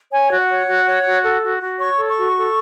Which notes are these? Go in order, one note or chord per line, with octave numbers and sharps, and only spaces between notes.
C#5 G#5
F#4
F#5
C#5
F#4
C#5
F#4
A4
F#4
F#4
C#5 C#6
A4
C#6
F#4
A4